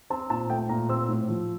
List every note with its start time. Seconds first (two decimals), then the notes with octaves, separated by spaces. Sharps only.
0.10 C4 A5
0.30 A#2 A5
0.50 A3 G5
0.69 A#2 A#5
0.89 C4 E6
1.09 A2
1.29 F3